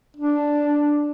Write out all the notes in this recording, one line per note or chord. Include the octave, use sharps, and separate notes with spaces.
D4